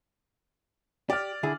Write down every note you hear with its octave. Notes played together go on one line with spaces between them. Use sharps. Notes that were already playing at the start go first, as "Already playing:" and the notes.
G4 D5 F6
D3 E4 G#4